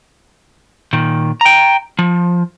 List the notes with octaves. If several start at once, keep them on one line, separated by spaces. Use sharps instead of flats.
A#2 D#3
G5 A#5
F3